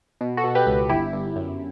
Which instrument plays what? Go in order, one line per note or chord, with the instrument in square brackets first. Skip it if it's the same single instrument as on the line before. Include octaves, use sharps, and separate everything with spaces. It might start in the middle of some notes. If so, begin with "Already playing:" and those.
[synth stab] B2
F#4 A4
B2
G4 B4
C#2
G1 E4 G4
G1
F#2